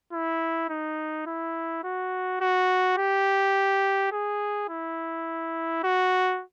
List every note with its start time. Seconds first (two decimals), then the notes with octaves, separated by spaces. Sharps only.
0.13 E4
0.69 D#4
1.27 E4
1.84 F#4
2.41 F#4
2.98 G4
4.12 G#4
4.69 E4
5.84 F#4